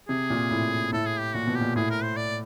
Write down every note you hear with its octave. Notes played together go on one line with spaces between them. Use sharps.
C3 G#4
A#2
A2
A2 A4
G#4
G4
A#2 F#4
B2
G4
A#2
A2 G#4
A#4
C5
D5